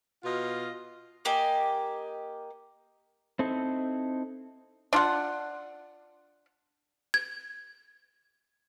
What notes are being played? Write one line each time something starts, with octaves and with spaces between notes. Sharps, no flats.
B2 F4 D#5 F5
A#3 G4 D#5 G#5
C4 D#4 E4 A4
D4 F4 F#5
G#6